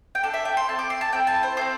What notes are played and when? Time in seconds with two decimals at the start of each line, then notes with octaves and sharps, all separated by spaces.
0.15 G5
0.23 D4 A4 A5
0.34 E5
0.45 G5
0.57 C6
0.68 C4 E4 A4 A5
0.79 D6
0.90 C6
1.01 A5
1.12 C4 E4 A4 G5
1.27 A5
1.43 C5
1.57 E4 A4 C5
1.61 C4